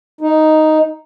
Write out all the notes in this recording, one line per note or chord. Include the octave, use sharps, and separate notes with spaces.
D#4